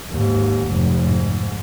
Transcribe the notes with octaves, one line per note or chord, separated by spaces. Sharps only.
D#2 G#2
F1
G#2